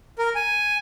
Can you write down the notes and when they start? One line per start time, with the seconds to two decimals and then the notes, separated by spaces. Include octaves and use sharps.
0.18 A#4
0.35 G#5